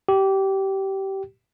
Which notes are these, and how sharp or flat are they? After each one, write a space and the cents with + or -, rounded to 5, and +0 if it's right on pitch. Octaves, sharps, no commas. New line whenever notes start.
G4 -20